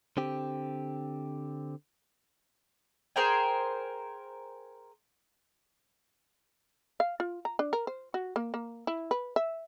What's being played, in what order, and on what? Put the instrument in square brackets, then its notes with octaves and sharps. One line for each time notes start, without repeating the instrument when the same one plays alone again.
[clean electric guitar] D3 C4 G4
[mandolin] G#4 A#4 C5 G5
[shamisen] F5
F4
A#5
D4
A#4
C5
F#4
A#3
A#3
E4
B4
E5